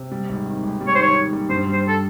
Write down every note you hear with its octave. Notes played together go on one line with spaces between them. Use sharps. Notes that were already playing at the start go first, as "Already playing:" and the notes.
Already playing: C3
G3
G#1
D#3
G#1
G3
C#5
C5
D#3 C#5
D#3
G3
G2 C5
G3
C5
A4